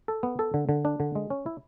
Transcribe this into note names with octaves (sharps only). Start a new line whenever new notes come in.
A4
B3
A4
D3
D3
D4
D3
G#3
C#4
E4